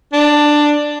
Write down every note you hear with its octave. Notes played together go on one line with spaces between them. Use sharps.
D4